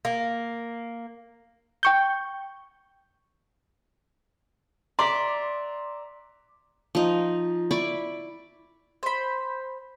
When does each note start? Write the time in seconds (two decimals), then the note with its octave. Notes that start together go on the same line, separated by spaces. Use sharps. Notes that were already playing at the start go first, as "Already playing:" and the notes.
0.05 A#3
1.83 G5 C#6 G6
4.99 D5 E5 A#5 C6 D6
6.95 F3 D#4
7.71 E4 D5 B5 C#6
9.03 C5 B5